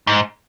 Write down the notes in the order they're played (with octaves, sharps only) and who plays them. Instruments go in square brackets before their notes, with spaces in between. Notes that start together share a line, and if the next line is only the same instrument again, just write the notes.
[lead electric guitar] G#2